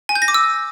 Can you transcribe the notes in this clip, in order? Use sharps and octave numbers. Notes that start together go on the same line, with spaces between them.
G#5
G6
A#6
D6
E6